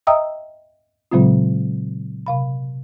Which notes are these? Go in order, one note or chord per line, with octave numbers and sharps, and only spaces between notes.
D#5 E5 G5 A#5 D#6 E6
A#2 C#3 F#3 G#3 C4 F4
C3 F5 B5